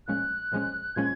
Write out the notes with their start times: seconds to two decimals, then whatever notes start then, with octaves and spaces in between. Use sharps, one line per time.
0.07 A#2 F3 G#3 C#4 F#6
0.52 A#2 F3 G#3 C#4
0.96 A#2 F3 G#3 C#4 G#6